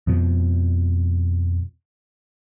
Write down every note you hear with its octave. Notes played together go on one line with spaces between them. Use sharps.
F2 B2 F3